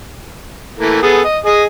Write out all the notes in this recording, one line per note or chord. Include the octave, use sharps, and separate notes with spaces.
E3 A3 A#3
B3 G#4 A4
D#5
G#4 D#5 D#6